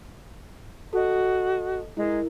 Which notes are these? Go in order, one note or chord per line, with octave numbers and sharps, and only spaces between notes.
F#4 A4 D#5
G#3 E4 A#4